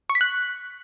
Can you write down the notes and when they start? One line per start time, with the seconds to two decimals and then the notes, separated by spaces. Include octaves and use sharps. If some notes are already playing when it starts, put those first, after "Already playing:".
0.10 C#6
0.15 B6
0.21 F#6